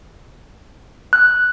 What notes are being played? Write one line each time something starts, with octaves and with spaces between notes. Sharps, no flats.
F#6